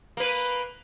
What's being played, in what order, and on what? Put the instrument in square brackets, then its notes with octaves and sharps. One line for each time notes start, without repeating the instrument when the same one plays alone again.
[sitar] A#3 B4